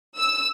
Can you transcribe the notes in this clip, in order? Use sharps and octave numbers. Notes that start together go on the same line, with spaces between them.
E6